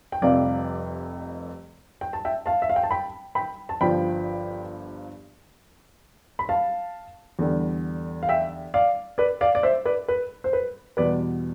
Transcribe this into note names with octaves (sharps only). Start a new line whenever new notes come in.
G5
F1 F2 C3 G3 D5 F5
G5
A5
E5 G5
F5 A5
E5
F5
G5
A5
G5 B5
G5 B5
A5
G1 G2 F3 G5 B5
B5
F5 A5
E2 D3 G3
F5
E5 G5
D5 F5
B4 D5
D5 F5
D5
C5 E5
B4 D5
B4
C5
B4
E2 B2 G3 B4 D5